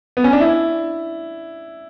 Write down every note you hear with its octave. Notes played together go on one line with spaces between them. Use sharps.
B3
C#4
D4
E4